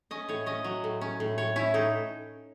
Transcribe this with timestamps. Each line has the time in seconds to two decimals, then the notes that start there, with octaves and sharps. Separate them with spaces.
0.11 C#4 D#5
0.29 A2 C#5
0.46 C#4 D#5
0.64 F#3
0.84 A2
1.01 C#4
1.20 A2
1.38 A2 C#5
1.56 C#4 E4
1.74 A2 D#4